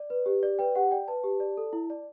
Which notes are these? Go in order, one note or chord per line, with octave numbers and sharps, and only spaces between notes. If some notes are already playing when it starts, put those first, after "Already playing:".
Already playing: D5
B4
G4
D5
B4 G5
G4 F#5
D5 G5
B4 A5
G4
D5
A4
E4
D5